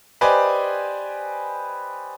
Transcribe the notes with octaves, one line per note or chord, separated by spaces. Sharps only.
G4 B4 C5 D5 D#5 G#5